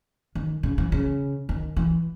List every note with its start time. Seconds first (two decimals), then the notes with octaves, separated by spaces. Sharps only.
0.35 D#3
0.63 C#3
0.78 E3
0.92 C#3
1.49 D#3
1.76 E3